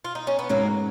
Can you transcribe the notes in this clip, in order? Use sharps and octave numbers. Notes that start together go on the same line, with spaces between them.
F4
D#4
C#4
B3
G#2 F#3 A#3